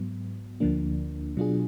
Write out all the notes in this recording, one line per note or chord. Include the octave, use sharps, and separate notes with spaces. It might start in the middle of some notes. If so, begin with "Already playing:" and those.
Already playing: G#2 F#3 B3
D2 D3 F3 A#3 D4
B2 F#3 D4 F4 G#4